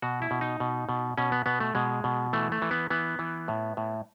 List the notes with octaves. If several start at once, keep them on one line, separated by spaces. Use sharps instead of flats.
B2 F#4
E4
B2
D#4
B2
B2
B2 C#4
B3
B2 B3
A3
B2 G#3
B2
E3 A3
A3
E3
B3
E3 B3
E3
A2
A2